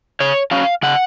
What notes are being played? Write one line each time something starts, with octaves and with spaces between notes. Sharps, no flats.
C#3 C#5
F#3 C#4 F5
C#3 F#5